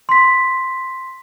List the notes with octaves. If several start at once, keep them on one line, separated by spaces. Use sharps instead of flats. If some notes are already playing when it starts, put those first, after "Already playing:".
C6 B6